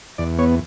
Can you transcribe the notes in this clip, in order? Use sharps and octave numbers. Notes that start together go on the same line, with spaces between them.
E2 D5
B3 C#5